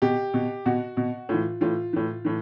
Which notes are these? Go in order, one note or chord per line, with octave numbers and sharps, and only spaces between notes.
B2 G4
B2
B2 F#4
B2
A2 E3 F4
A2 E3 F4
A2 E3
A2 E3